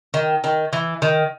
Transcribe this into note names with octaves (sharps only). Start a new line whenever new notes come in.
D#3
D#3
E3
D#3